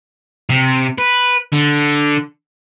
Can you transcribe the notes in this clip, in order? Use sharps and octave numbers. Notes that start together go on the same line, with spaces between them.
C3
B4
D3